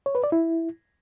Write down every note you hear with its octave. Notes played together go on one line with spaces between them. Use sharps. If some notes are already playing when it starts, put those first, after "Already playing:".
C#5
B4
D5
E4